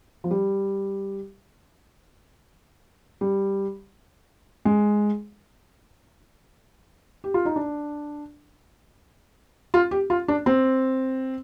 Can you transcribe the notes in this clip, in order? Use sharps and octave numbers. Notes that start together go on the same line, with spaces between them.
F3
G3
G3
G#3
G4
F4
D#4
D4
F4
G4
F4
D4
C4